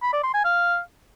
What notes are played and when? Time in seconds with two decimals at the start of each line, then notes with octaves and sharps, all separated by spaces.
0.02 B5
0.13 D5
0.23 C6
0.34 G#5
0.44 F5